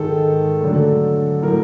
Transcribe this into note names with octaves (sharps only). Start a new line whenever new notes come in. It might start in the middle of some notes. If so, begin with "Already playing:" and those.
Already playing: G#2 D#3 G#3 A4
D3 F#3 A3
A2 F#3 A3 A#4